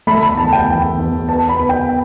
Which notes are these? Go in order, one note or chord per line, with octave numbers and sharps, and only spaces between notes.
A3 B5
B5
E2 A5
G5
E2
E2
B3 A5
B5
B3
G5